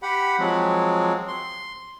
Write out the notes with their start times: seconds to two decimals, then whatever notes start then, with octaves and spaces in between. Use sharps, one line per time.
0.03 G4 F#5 B5
0.39 F3 F#3 G#3 C4
1.28 C6